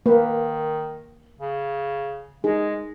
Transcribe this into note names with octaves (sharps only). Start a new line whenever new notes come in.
D#3 A#3 B4
C#3
G#3 D#4 G#4